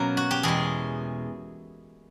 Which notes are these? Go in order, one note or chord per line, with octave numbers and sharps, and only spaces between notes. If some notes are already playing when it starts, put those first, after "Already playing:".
Already playing: B2 F#3 A#3 C#4 A#4
F#4
G4
E2 B2 G#3 G#4